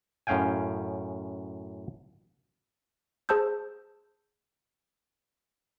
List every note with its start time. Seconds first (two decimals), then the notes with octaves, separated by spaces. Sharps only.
0.27 F#2 A2 C#4 F5 G5 G#5
3.29 G#4 C5 A5 E6 G6